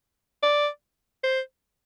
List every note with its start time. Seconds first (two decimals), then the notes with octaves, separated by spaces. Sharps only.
0.43 D5
1.24 C5